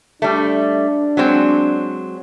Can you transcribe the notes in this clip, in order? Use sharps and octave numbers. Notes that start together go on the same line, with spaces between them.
G3 A3 D4
F#3 G#3 C4